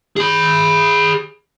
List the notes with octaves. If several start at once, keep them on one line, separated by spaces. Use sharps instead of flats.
G#4 B5